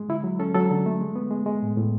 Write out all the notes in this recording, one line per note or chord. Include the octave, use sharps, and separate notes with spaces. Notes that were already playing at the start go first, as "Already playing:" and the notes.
Already playing: G#3
D3 E4
F#3
C#4 A4
F#3 A4
D3
A3
G#3
B3
G#3
G#3
A2
A2